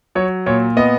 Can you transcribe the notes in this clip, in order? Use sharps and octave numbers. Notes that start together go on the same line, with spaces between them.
F#3 C#5
A#2 C#5
B3 D#5